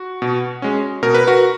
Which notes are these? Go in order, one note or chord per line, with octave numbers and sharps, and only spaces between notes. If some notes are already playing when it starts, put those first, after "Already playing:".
Already playing: F#4
B2
G#3 C#4
B2 A#4
B4
F#4 A#4